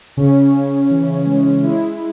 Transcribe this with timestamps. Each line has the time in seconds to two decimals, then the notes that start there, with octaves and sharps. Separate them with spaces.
0.17 C#3 C#4
0.54 C#3
0.90 E3
1.26 G#3
1.63 G#3 E4